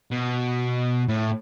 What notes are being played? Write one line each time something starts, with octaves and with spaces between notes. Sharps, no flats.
B2
A2